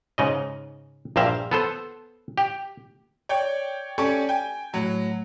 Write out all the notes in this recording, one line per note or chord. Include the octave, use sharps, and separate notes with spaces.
G#2 C#3 D#5
A#1 G2 A#3 C5 E5 F5
B3 A4 C5
G4
C#5 D5 G5
C#4 G4 A4 D5 G#5 C#6
G5 G#5
A2 F#3